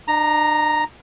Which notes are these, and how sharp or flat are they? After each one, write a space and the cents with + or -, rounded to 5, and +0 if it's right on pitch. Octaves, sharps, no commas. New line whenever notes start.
D4 +45 A#5 +0